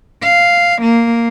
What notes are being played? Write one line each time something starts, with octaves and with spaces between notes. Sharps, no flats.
F5
A#3